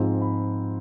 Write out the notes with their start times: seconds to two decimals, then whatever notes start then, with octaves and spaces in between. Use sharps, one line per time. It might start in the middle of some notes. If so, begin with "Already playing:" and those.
Already playing: G#2 F3 G#3 C4
0.21 B5